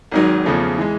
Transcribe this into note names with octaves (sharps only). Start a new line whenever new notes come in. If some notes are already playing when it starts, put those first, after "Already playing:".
G#1 G#2 D#3 F#3
E2 C#3 F3 A3
E3 G#3